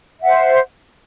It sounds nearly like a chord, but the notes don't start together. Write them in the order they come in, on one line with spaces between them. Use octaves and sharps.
E5 F#5 C5